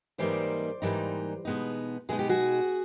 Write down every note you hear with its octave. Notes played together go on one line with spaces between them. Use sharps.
G#2 E3 G3 A#3 D#4 C5 D5
G#2 E3 G3 A#3 D#4
B2 G#3 B3 D#4
B2 G#3 B3 D#4 G#4
G4
F#4 G#4